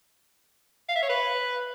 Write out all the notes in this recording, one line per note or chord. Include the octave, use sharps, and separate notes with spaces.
F5
E5
C#5
B4